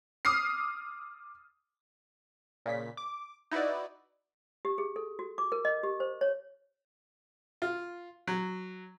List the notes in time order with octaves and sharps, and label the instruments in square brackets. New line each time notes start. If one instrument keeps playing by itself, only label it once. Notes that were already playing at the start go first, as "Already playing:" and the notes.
[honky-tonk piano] D6 D#6 F6 C7
[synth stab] A#2 C#3 B6
D6
D#4 E4 F#4 B4 D5
[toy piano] G4
G#4
A4
F#4
D6
A#4
D#5
G4
C5
C#5
[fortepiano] F4
F#3